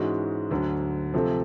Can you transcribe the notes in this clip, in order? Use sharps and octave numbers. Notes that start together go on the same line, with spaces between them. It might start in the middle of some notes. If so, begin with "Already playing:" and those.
Already playing: G#2 E3 G#3 C#4 F#4
D2 D3 F#3
C3 F3 A3